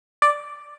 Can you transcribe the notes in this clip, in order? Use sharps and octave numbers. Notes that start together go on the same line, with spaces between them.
D5